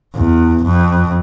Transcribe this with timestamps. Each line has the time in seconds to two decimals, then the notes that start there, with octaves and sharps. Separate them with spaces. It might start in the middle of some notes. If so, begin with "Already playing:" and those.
0.16 E2
0.65 F2